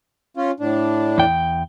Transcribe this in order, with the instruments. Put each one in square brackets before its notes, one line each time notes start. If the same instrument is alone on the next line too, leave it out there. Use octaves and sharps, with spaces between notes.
[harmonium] C#4 F4
A2 D4
[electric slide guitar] E2 G5